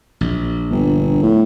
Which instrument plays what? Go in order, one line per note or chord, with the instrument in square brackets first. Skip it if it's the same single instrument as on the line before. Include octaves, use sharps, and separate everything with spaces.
[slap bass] A#1
[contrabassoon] G1
A2